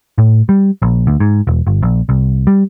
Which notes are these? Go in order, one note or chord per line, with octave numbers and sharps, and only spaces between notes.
A2
G3
A#1
D2
G#2
E1
G1
A#1
C2
G3